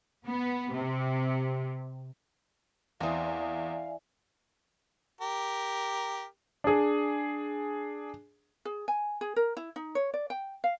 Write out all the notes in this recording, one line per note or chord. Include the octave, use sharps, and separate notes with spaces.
B3
C3
E2 E3 C4 D5 E5 F5 G#5 D#6
G4 A#4
D4 G#4
G#4
G#5
G#4
A#4
E4
D#4
C#5
D5
G5
F5